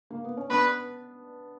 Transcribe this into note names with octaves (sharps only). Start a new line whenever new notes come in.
A#3
B3
C#4
B3 D4 B4